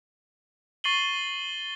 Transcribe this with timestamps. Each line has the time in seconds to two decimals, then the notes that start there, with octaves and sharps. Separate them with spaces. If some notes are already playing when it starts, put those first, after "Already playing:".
0.84 C#6 A6 C7 D#7 F#7 G7